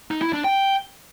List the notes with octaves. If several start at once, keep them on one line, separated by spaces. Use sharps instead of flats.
D#4
E4
D4
G5